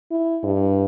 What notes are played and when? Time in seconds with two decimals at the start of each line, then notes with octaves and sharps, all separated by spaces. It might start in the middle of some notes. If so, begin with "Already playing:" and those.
0.11 E4
0.43 G2